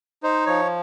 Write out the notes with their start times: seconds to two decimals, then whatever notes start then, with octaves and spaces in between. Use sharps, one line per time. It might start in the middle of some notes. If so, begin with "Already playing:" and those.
0.23 D#4 C5
0.46 F3 C#5